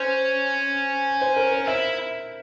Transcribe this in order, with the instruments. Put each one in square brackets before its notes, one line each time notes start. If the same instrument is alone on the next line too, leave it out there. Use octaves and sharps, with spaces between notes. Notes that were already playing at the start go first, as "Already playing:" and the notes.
Already playing: [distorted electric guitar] C#4 [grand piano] C5
[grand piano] C5
A#4
C5
[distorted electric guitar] E4 [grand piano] E5